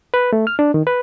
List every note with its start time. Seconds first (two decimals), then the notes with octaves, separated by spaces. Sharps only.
0.14 B4
0.33 A3
0.47 F6
0.59 D4
0.74 D#3
0.87 B4